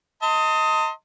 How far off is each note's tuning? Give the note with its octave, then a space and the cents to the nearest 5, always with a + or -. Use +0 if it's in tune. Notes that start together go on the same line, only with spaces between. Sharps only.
D#5 +20 A5 +45 C6 +0